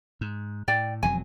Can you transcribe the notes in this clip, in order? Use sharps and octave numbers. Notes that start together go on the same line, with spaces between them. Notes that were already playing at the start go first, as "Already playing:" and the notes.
G#2
A2 D5 G5
E1 F2 F#3 G#5